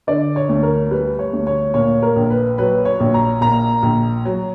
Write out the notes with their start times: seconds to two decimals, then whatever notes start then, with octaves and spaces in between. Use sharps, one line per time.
0.07 D3 D5
0.36 C#5
0.49 D2
0.63 A#4
0.91 G3 B4
1.19 C#5
1.33 D2
1.47 C#5
1.74 A#2 C#5
2.02 A#4
2.16 A#1
2.30 B4
2.58 F#3 B4
2.85 C#5
3.00 A#1
3.14 A#5
3.41 A#2 A#5
3.83 A#1
4.25 F#3